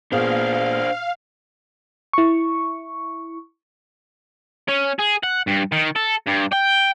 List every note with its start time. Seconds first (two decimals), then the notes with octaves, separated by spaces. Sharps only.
0.12 A#2 B3 D4 G#4 C5 F5
2.13 E4 C#6
4.68 C#4
4.99 G#4
5.23 F#5
5.47 G2
5.72 D#3
5.96 A4
6.27 G2
6.53 G5